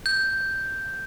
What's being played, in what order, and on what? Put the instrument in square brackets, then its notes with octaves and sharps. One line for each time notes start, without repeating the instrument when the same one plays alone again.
[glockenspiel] G6